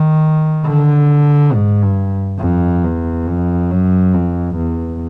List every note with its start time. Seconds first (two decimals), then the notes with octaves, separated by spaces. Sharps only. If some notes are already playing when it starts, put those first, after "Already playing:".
Already playing: D#3
0.66 D3
1.53 G#2
1.82 G2
2.40 F2
2.83 E2
3.27 F2
3.71 F#2
4.13 F2
4.56 E2